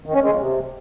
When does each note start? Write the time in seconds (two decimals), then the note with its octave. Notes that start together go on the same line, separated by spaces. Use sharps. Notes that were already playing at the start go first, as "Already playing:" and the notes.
0.06 D#3
0.14 C#4
0.23 G#3
0.31 A#2
0.40 C3